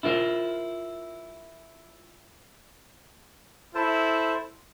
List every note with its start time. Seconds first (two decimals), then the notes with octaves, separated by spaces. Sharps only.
0.03 E4 F4 A#4 C5
3.75 E4 A4 C5 A5